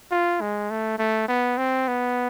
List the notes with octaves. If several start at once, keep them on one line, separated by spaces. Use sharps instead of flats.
F4
G#3
A3
A3
B3
C4
B3